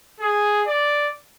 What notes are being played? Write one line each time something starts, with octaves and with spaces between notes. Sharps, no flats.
G#4
D5